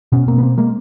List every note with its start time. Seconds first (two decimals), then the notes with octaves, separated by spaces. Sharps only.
0.12 B2 B3 C#4
0.28 A#3 C4
0.38 B3
0.43 A#3 C4
0.58 G#3 A#3